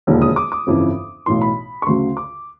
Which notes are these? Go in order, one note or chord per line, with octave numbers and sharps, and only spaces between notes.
E1 D#2 D3 F3
D#6
D6
D6
G1 F2 C#3 E3
B1 A2 E3 C6
B5
C#6
D2 C#3 F#3 C6
D6